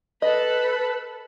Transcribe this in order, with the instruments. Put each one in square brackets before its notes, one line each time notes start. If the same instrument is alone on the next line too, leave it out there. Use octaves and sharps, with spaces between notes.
[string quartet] A4 A5 B5 [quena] B4 [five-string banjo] D#5